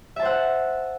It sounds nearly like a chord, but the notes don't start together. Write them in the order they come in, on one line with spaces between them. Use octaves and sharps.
E5 A5 C5 F#5